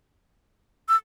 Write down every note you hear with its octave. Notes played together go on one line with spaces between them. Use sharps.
E6